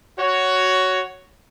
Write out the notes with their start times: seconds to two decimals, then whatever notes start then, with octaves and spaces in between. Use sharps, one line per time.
0.19 F#4 C#5